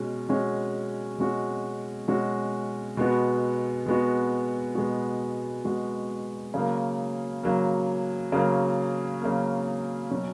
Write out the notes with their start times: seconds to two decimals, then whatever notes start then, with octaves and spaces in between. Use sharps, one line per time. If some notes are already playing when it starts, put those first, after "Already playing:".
Already playing: B2 G#3 C#4
0.29 B2 G#3 C#4 F#4
1.18 B2 G#3 C#4 F#4
2.08 B2 G#3 C#4 F#4
2.97 B2 G#3 B3 F#4
3.86 B2 G#3 B3 F#4
4.75 B2 G#3 B3 F#4
5.65 B2 G#3 B3 F#4
6.54 C#3 F#3 A#3
7.43 C#3 F#3 A#3
8.32 C#3 F#3 A#3
9.22 C#3 F#3 A#3
10.11 B2 F#3 C#4